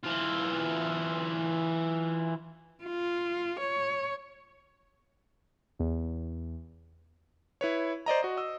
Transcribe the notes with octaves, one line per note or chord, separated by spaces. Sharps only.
E3 F4
F4
C#5
E2
E4 B4 C#5
C5 D5 D#5 A#5
F#4 D#5
D#5 E6